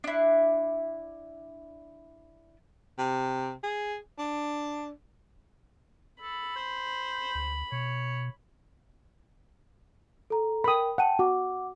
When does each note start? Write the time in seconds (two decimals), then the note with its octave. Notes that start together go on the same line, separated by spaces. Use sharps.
0.04 D4 E4
2.98 C3
3.64 G#4
4.19 D4
6.21 A4 B5
6.56 C5
7.35 D2
7.72 B2 C#5
10.30 A4 A#5
10.64 A#4 G5 B5 D#6
10.98 F#5 G5 A5 D#7
11.19 F#4 F#5 D6